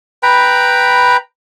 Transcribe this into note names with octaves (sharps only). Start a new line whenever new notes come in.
B4 G5 A#5 B5